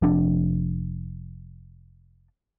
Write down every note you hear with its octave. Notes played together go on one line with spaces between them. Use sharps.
F1 F2 D4